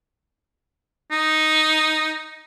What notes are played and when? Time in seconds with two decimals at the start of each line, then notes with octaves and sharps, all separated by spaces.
1.11 D#4